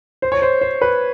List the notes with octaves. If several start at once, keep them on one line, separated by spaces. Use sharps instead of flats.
C5
C#5
C5
C5
B4